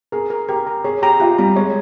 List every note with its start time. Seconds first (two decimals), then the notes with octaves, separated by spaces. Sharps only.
0.12 G#4 A#4
0.30 A#4
0.49 G4 A#4
0.67 A#5
0.84 G#4 C#5
1.02 G4 A#5
1.20 F4 G4
1.38 G3 A#5
1.56 G#3 C#5